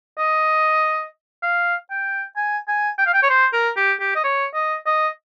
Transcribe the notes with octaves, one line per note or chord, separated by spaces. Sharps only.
D#5
F5
G5
G#5
G#5
G5
F5
G5
C#5
C5
A#4
G4
G4
D#5
C#5
D#5
D#5